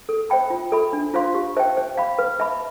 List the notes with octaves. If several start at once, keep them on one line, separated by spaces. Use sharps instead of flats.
A4
C5 E5 G5 B5
F4
A4 E5 B5
D4
F4 C5 F5 C6
G4
C5 E5 G5
C5
F5 B5
B4
E5 B5